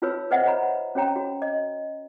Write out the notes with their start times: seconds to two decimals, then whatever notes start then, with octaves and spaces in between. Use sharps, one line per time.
0.02 D#4 F4 F#4 B4 C#5 E6
0.31 B4 C5 D#5 E5 F#5
0.46 B4 C#5 A#5 B5
0.95 C#4 F#4 C#5 G5 A#5
1.16 F#4
1.42 D#5